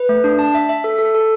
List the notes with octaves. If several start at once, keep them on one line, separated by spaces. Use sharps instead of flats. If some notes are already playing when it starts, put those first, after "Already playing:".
Already playing: B4
A3
D4
A5
E5
E5
A4
A4
A4